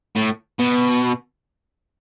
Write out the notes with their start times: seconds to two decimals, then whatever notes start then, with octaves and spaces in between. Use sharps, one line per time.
0.16 A2
0.59 B2